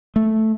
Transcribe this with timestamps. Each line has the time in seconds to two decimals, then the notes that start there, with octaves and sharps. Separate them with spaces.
0.16 A3